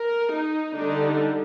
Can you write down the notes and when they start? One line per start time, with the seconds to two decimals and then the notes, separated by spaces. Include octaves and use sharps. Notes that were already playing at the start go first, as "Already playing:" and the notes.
Already playing: A#4
0.33 D#4
0.75 D3 G3 D4 D#4